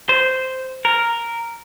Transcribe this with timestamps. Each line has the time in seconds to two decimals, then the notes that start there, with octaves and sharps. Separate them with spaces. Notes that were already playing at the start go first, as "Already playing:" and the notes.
0.09 C5
0.85 A#4